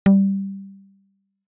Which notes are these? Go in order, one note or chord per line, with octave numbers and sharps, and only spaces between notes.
G3